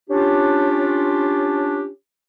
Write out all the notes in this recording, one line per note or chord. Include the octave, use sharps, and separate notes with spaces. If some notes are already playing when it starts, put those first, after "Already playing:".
C#4 D4 F4 G4